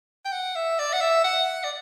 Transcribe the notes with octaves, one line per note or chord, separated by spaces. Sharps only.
G5
F#5
E5
D5
F#5
E5
F#5
D5